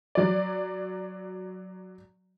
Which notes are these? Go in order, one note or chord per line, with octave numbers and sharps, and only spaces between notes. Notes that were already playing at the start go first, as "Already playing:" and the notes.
F#3 D5